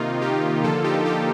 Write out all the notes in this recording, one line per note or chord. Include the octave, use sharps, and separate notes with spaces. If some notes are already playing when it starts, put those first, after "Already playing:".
Already playing: C3 D#3 A#3 D#4 F4
D#4 G4
D3 F3 A#3 F4 A4
D#4 G4
D#4 G4